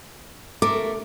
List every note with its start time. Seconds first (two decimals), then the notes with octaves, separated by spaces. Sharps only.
0.62 A3 A#4 D6